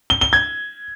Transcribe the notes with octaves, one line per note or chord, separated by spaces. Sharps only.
G7
G7
G#6